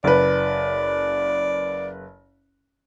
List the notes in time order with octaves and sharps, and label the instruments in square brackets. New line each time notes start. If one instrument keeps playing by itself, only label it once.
[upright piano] F#1 B4 [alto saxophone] D5